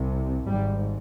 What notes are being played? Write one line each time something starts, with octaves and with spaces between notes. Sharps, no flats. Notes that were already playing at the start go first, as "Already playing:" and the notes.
Already playing: C2 C3
G#1 G#2 G3